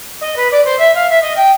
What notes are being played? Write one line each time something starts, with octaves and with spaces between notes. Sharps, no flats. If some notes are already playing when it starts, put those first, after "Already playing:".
D#5
B4
D5
C5
E5
F5
E5
D#5
G5